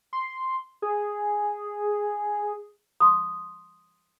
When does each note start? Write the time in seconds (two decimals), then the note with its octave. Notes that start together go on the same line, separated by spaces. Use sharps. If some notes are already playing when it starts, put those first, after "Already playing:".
0.13 C6
0.82 G#4
3.00 C6 D#6